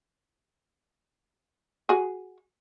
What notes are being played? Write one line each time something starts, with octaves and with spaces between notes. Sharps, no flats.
F#4 G#4